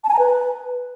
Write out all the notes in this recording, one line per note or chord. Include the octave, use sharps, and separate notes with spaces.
A5
G#5
A#5
B4